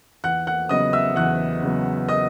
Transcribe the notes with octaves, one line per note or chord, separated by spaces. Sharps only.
E2 F#5 F#6
F#5 F#6
C#3 F#3 B3 D#5 D#6
E5 E6
E2 F#5 F#6
C#3 F#3 B3
D#5 D#6